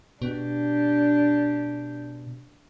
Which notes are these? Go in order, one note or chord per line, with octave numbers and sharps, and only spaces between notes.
B2 D4 G4